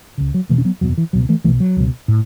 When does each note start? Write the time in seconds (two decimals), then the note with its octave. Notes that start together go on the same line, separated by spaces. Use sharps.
0.18 C#2 C#3
0.34 F#3
0.49 E1 E2 B2 E3 A3
0.58 C#4
0.65 F#3 B3
0.81 F#1 E2 B2 F#3
0.98 E3
1.13 C#2 B2 F#3
1.29 E3 A3
1.44 B1 B2 E3 A3
1.60 F#3
1.77 C#2 B2
2.08 A2